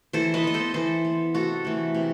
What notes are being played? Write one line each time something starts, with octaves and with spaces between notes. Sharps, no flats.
E3 A4 C5
B4 D#5
B3 D#5
A4 C5
E3 A4 C5
B3
C3 F#4 A4
E3 A3
C3